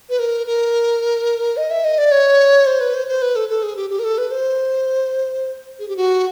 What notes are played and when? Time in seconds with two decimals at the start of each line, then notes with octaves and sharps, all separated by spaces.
0.10 B4
0.19 A#4
0.47 A#4
1.57 D#5
1.70 E5
1.84 D#5
1.98 D5
2.11 C#5
2.66 C5
2.80 B4
2.94 C5
3.08 C5
3.22 B4
3.36 A4
3.49 A4
3.63 G#4
3.76 G4
3.90 G4
3.99 A#4
4.04 A4
4.18 B4
4.31 C5
5.79 G#4
5.88 G4
5.96 F#4